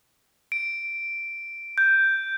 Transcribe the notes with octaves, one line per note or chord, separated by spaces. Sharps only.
D7
G6